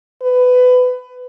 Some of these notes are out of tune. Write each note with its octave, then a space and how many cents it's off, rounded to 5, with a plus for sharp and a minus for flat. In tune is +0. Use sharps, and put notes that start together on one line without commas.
B4 +20